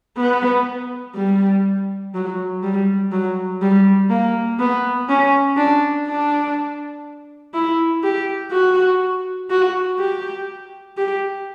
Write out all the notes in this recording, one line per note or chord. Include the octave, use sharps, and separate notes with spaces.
B3
G3
F#3
G3
F#3
G3
A#3
B3
C#4
D4
D4
E4
G4
F#4
F#4
G4
G4